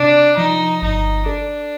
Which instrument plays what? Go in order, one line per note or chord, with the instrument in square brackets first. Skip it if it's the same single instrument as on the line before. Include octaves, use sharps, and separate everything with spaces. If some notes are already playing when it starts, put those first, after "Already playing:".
Already playing: [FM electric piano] C3 [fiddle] D4
[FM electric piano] F3 [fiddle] D#4
[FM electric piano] G1 [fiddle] D#4
[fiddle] D4 [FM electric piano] A4